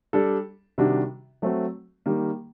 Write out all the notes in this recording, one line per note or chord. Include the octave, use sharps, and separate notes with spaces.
G3 D4 A4
C3 D#3 G3 D4 F#4
F#3 A3 C4 F#4
D#3 G3 A#3